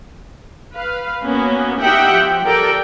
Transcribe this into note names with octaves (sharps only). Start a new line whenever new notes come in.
B4 F5
A#3 B3 C#4 F#4
D#4 G4 E5 F#5 G5
F3
G4 A4 A#4 D5 G5